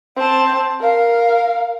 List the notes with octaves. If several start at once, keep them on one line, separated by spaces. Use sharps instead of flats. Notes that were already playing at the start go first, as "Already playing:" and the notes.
C4 A5
A#4 F5